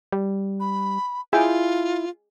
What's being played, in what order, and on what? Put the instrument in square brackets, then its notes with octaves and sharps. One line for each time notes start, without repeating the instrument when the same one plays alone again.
[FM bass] G3
[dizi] B5
[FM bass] E4 [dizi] F4 [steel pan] G#4 G5 G#5